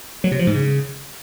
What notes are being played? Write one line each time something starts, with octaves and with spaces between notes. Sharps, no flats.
F#3
C3
F3
G#2
C#3